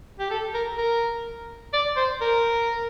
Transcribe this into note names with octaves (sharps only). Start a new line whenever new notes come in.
G4
A4
A#4
A#4
D5
C5
A#4